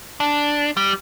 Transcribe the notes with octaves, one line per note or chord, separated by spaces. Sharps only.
D4
G3